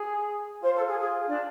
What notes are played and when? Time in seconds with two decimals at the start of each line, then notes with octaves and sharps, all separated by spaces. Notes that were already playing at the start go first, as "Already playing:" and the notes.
Already playing: G#4
0.63 F4 C5
0.75 A4
0.88 G#4
0.99 G#4
1.28 D4